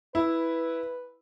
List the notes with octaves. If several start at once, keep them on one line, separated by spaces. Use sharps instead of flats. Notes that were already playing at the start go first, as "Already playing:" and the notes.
E4 B4